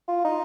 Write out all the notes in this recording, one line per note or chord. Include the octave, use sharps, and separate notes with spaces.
F4
D#4